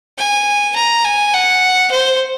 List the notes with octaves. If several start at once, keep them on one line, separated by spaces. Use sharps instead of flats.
G#5
A#5
G#5
F#5
C5